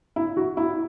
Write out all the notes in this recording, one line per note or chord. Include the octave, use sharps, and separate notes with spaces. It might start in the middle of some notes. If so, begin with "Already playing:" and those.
E4
F#4
E4